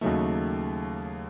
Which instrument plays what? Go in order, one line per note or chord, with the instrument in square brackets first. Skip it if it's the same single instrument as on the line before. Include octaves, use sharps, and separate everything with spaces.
[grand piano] D#2 C#3 F#3 A3 D#4